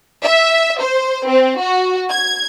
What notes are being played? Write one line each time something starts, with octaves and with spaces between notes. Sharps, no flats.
E5
C5
C4
F#4
G#6